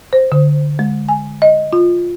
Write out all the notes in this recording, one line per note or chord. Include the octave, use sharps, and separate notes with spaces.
C5
D3
G#3
G#5
D#5
F4